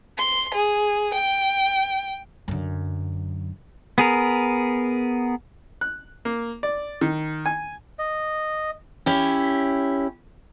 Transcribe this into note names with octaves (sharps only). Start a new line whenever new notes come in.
C6
G#4
G5
F#2 D3
B3 G#4 A#4
F#6
A#3
D5
D#3
G#5
D#5
C#4 E4 G4